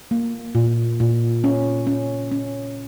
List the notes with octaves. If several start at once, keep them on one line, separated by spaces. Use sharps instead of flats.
A#3
A#2
A#2
C#4
C#4
C#4